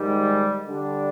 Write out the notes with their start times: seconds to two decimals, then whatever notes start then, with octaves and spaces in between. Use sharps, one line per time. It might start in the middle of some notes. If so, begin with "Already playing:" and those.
Already playing: G#2 D#3 G3
0.66 D3 G3 D4